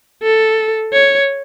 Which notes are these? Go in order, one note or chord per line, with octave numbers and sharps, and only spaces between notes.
A4
C#5